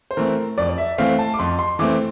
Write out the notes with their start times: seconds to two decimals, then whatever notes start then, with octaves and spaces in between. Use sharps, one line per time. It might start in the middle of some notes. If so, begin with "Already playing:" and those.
0.11 C5
0.17 E3 A3 C4 A#4
0.58 F2 D5
0.69 D5
0.78 E5
0.98 E3 A3 C4 F5
1.19 A5
1.34 D6
1.39 F2 C6
1.59 C6
1.79 E3 A3 C4 D6